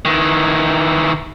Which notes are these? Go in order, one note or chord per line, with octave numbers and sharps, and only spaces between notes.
D#3 E3